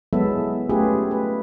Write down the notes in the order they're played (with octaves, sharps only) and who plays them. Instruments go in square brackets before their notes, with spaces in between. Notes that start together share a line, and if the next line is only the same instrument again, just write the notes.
[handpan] F#3 G#3 B3 E4 A4 E5
A3 C#4 F4 G4 G#4 B4
B4